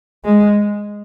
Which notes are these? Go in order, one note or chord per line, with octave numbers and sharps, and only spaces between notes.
G#3